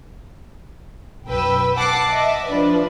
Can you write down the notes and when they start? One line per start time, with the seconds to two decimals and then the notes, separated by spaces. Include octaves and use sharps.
1.26 B1 F#2 B4 G5 E6
1.77 F#5 A5 D6 C7
2.10 D#5 E5
2.47 F3 D4 B4 D5